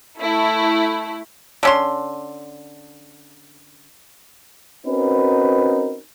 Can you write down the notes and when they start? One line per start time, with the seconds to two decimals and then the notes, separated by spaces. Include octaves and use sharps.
0.21 A3 E4
1.63 D3 C#4 C6
4.87 C4 C#4 D#4 F#4 A#4 B4